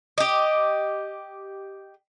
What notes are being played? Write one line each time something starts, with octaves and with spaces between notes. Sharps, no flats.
G4 D#5